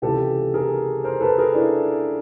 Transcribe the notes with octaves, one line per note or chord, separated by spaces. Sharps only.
C#2 C3 E3 G4 A4
G#4 A#4
A#4 C5
A4 B4
G#4 A#4
D4 E4